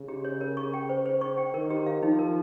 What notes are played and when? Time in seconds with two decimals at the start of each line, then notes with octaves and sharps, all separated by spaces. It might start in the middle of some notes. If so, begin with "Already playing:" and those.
Already playing: C#3
0.08 G4
0.25 C#5
0.41 A#4
0.57 C#6
0.74 G5
0.89 C5
1.06 C5
1.21 C#6
1.38 G5
1.54 D#3 A#4
1.70 G4
1.86 F5
2.03 F3 D#4
2.19 A#4